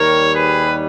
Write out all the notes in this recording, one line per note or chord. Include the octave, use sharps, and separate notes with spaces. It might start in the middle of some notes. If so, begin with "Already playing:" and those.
Already playing: D#2 D#3 G3 A#4 C#5
G#4 B4